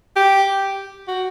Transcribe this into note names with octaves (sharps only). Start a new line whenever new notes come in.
G4
F#4